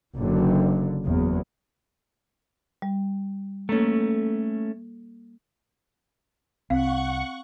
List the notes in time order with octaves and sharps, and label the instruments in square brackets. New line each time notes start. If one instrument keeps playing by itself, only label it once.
[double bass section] F#1 D3
F#1 E2
[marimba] G3
[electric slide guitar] A3 C#4 [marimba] A#3 A4
[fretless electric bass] C2 [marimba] C4 [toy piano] F5 [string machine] F#5 C#6